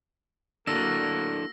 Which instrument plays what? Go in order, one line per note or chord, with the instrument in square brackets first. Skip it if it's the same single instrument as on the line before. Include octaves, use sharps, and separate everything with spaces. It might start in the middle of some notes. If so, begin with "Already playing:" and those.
[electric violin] A#3 F#4 [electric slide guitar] D4 E4 A4 [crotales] E6 A#6